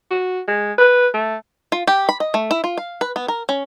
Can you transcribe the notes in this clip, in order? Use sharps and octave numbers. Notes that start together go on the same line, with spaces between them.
F#4
G#3
B4
A3
F4
G4
B5
D#5
A3
E4
F4
F5
B4
B3
A#4
C#4